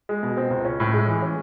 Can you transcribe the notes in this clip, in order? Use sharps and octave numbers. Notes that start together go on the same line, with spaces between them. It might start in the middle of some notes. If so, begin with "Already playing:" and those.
G#3
B2
C4
C#2
C#4
A2
G#3
E3
C#4